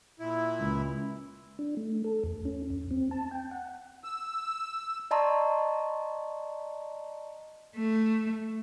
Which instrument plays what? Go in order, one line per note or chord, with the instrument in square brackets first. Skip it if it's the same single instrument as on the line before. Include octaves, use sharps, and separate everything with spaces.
[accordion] A#2 E4
[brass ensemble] C#2
[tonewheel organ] D4
A3
A4
E2
C#4
E2
C4
A5
G5
F#5
[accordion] E6
[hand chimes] D5 D#5 A5 A#5 C6 C#6
[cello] A3